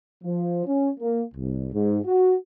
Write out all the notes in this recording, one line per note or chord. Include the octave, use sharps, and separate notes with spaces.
F3
C#4
A#3
C2
G#2
F#4